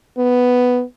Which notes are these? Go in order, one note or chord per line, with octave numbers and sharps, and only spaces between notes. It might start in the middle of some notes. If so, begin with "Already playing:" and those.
B3